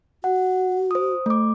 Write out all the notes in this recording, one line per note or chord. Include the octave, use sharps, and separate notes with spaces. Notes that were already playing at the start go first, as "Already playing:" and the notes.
F#4 F#5
C5 D#6
A3 D6